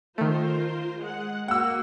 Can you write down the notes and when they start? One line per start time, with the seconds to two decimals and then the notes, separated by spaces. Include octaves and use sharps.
0.18 D#3 A3 F4 A#4 C5
1.00 G#3 F#5
1.48 A#3 F#4 F#5 E6